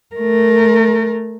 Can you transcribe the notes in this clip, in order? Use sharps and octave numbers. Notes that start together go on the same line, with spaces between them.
A3 A#4